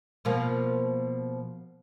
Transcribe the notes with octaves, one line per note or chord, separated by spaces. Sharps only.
B2 F3 A#3